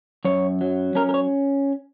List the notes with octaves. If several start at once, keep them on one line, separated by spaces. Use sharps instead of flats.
F#2 C#5
F#3
C#4 A#4
A#4
C#5